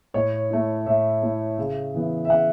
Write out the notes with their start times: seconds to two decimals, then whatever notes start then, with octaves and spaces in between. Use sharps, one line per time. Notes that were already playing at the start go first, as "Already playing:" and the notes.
0.14 A2 C#5
0.50 A3 E4
0.86 A2 E5
1.22 A3 E4
1.58 C#3
1.94 E3 B3 E4
2.25 E5
2.29 C#3 F#5